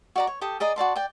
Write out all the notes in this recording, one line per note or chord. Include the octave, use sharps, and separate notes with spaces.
F#4 D5 A#5
C#5
G4 A4 D#6
G#4 D5 D#5 A#5
F#4 D5 A5 C6
D5 G5